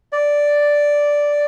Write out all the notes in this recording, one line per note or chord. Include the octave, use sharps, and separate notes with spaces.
D5